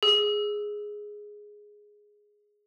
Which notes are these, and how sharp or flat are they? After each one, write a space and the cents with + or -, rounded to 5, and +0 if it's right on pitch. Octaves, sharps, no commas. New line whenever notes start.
G#4 +0 E6 +0